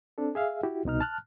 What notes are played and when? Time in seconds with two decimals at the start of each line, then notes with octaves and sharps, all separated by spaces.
0.18 C4 D4 A4
0.35 G#4 E5 F5
0.63 E4 F#4 G4
0.85 C2 B2 D#4 F6
1.01 A5 F6 F#6